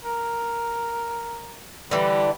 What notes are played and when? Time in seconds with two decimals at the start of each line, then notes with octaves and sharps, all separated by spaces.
0.05 A#4
1.91 D3 E3 G3